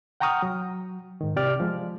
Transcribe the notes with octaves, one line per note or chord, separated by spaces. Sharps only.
F#5 G5 A#5 C#6 D#6 F6
F#3
G#2 D#3
C3 G4 D5 F6
F3 G#3